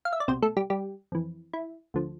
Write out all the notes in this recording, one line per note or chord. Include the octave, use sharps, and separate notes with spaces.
F5
E5
D5
C2 B2 C4 C5
A3 A4
G3 G4
G3 G4
F2 E3
E4
D2 D3 F3